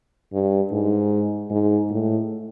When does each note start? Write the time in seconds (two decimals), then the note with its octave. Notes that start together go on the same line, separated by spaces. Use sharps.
0.33 G2
0.72 G#2
1.51 G#2
1.91 A2